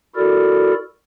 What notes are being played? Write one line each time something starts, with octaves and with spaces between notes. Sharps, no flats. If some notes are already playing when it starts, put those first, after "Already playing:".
E4 F#4 A4 A#4 D5